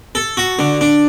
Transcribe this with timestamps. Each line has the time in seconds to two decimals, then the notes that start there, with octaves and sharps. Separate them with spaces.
0.15 A4
0.37 F#4
0.59 D3
0.81 D4